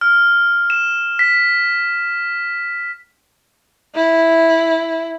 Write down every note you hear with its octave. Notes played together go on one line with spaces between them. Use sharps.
F6
E7
B6
E4